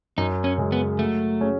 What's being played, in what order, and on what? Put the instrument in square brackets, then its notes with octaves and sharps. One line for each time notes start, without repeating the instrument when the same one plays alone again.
[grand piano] F#2 [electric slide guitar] D#4
[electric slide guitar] C#4
[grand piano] C#3 G#3
[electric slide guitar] B3
[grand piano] F#3 [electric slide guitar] A3
[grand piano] C#4 G#4 C#5